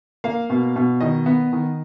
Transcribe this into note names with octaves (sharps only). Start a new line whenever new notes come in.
A#3 F5
B2
B2
D#3 D#5
B3
D#3